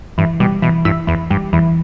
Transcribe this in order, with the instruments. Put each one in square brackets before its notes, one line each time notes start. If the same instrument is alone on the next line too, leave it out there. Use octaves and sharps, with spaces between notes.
[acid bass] G2 [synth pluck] E3
[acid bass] B2 [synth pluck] G3
[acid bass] B2 [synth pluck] E3
[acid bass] G2 [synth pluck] E4
[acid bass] E2 [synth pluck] E3
[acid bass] G2 [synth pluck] G3
[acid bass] E2 [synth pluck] E3